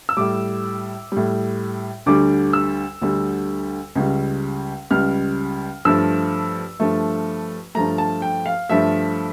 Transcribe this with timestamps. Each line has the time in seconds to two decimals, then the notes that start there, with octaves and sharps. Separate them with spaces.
0.09 E6
0.17 A2 G3 D6
1.12 A2 G3
2.06 D2 D3 G3 D6
2.53 E6
3.01 D2 D3 G3
3.95 C#2 C#3 G3
4.91 C#2 C#3 G3 F6
5.85 G2 F3 A3 E6
6.80 G2 F3 A3
7.75 G2 F3 A3 A#5
7.98 A5
8.22 G5
8.46 F5
8.69 G2 F3 A3 E5